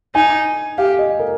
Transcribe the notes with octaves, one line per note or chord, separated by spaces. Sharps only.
D#4 G#5
G4 F5
D#5
A#4